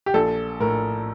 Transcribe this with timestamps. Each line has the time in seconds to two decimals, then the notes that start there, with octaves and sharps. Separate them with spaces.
0.06 G4
0.14 A#1 A4
0.60 A2 A#4